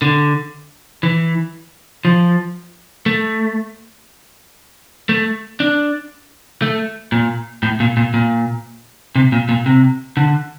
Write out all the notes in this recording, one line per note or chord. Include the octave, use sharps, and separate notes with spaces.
D3
E3
F3
A3
A3
D4
A3
A#2
A2
A#2
A#2
A#2
C3
A#2
A#2
C3
D3